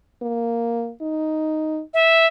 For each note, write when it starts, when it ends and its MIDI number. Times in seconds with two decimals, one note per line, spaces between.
0.22 0.92 58
1.01 1.82 63
1.94 2.27 76